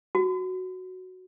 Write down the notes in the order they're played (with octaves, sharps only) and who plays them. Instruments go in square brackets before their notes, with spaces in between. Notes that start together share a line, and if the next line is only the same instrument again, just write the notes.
[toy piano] F#4